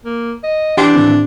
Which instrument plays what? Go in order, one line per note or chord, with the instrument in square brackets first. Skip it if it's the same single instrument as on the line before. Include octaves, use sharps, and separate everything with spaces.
[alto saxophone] A#3
D#5
[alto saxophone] E3 [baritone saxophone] D4 [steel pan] G4 C6 [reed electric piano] F#5
[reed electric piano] A2 D#3 C4